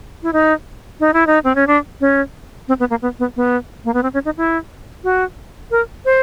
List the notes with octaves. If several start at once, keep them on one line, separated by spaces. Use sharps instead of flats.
E4
D#4
D#4
E4
D#4
C4
C#4
D4
C#4
C4
B3
A#3
B3
B3
B3
A#3
B3
C4
C#4
D#4
E4
F#4
A#4
C5